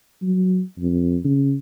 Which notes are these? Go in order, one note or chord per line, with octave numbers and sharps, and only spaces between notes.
F#3
F2
C#3